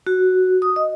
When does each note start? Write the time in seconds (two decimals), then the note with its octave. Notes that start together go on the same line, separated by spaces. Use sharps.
0.07 F#4
0.62 D#6
0.76 D#5